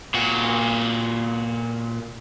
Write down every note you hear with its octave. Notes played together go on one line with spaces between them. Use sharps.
A#2 F#4